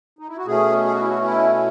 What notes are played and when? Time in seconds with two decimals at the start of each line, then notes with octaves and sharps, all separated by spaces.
0.19 D#4
0.28 E4
0.38 F#4
0.45 B2 A3 C#4 G#4
0.85 G#4
0.93 F#4
1.01 E4
1.08 F#4
1.24 E4